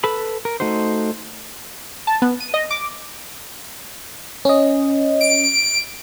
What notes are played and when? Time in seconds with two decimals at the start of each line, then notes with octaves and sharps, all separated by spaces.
0.04 A4 B4 B5
0.45 A#4
0.60 A3 D#4 F#4 C5
2.07 A5
2.22 B3
2.40 D#7
2.54 D#5
2.71 D6
4.45 C#4 D#5
5.21 D7